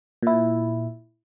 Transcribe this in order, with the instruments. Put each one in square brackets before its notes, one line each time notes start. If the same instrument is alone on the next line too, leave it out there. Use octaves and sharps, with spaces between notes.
[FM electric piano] A#2 E4